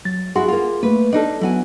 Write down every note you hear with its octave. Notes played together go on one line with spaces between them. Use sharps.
F#3 A6
E4 F#4 G#4 C6
A#3 F4
A3 A#3 B4
D4 D#4 A4 D#5
F#3 B3 E4 F#4 G#5